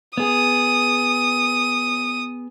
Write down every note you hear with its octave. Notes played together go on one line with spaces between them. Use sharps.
B3 G#4 D#6